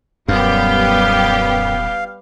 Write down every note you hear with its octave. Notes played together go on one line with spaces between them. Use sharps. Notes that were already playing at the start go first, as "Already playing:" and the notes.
D#1 F#2 G3 B3 G4 F5